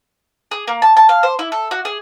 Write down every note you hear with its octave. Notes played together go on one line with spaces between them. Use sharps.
G#4
A#3
A5
A5
F5
C5
E4
A4
F#4
G#4